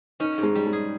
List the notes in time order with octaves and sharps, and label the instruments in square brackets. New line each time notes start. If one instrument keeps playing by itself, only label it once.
[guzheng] C#4 [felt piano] D#4
[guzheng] G#2
[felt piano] G#3
[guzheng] G3
[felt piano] G#3
[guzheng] G#4